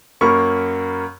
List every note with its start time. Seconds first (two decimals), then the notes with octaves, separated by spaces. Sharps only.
0.21 F#2 A#3 A#4 B5 C#6